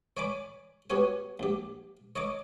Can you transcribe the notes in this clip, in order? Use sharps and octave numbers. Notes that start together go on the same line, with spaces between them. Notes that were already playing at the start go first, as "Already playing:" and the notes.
C#5 D5 G#5 B5 D6
B3 F#4 G4 C#5 G#5
A#1 G4
C#5 D#5 A#5 D6